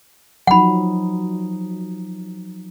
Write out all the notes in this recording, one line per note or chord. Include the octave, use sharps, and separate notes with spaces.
F3 F#3 D#4 F#5 B5